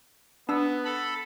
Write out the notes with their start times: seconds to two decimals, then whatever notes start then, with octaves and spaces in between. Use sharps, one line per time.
0.49 B3 D4 E6
0.85 A4 B5